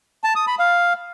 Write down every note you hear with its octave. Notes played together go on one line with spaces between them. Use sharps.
A5
D#6
B5
F5